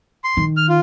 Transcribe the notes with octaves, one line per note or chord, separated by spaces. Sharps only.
C6
D#3
F6
F4